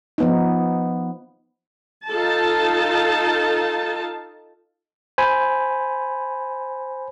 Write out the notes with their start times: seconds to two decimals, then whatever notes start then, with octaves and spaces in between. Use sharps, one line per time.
0.18 F3 B3 D#4
2.08 D#4 F4 A4 A5
5.18 C5 G#5 B5